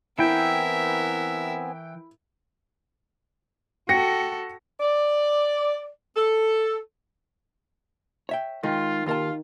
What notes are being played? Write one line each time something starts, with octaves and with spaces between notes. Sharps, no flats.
E3 B3 C4 E4 A#4 E5 G5 G#5
F#4 A4 G5 A#6 C#7
D5
A4
C#5 E5 G5
D#3 G#3 F4
D#2 F4 A#4 A5